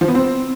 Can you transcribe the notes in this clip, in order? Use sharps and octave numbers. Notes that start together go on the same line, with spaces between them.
F3
B3
C4